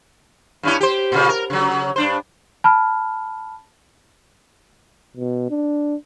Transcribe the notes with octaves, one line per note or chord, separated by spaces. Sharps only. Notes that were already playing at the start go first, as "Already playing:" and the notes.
G2 C#4 E4
G4 C5
A#2 C#3
A#4
C#3 F#3
G2 D4 C5
A5 B5 F6
B2
D4